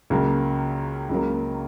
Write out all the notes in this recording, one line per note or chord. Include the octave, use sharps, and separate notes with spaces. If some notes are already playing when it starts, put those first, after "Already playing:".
C#2 C#3 F#3 A#3
C#2 C#3 F#3 A#3